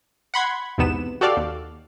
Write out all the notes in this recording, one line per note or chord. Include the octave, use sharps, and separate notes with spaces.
F#5 B5 C6 G#6
B1 E2 G#2 C3 B3 E7
F#4 G4 A4 D5 F5
D#2